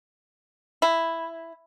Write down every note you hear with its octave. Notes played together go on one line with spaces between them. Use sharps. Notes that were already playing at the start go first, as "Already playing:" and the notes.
E4